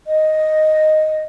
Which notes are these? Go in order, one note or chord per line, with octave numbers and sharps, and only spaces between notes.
D#5